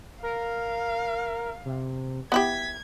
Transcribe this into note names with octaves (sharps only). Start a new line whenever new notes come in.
A#4 F5
C3
B3 E4 G4 G#6 B6